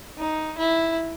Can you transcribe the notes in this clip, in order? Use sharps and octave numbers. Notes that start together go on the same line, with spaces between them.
D#4
E4